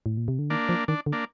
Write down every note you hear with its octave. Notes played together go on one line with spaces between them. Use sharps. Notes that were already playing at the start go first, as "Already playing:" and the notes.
A2
A#2
C3
D3
D#3 A#3 D4
F3
D#3 D4
D3
A#3 D4